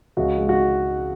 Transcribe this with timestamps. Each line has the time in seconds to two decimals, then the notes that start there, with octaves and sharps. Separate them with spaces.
0.17 C#2 F#4
0.38 G#3
0.49 F#4